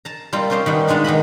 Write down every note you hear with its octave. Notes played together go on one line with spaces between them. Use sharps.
A5 A#5
G3 A#3 C4 F4
C#4 F4 G4 C5 D#5 F5
D#3 G3 B3 D#4
D#3 G#3 A#3 D4 F#4
D#3 B3 D#5 B5